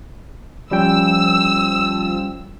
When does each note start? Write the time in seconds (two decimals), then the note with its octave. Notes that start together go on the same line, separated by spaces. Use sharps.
0.71 F3 G3 C#4 G5 E6